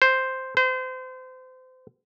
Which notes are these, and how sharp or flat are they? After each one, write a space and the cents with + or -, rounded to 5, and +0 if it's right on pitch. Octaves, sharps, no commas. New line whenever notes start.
C5 +0
C5 -30